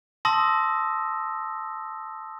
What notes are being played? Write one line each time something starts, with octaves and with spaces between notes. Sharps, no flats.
A5 C6 D#6 E6 A#6